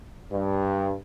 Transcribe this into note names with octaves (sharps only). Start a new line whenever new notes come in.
G2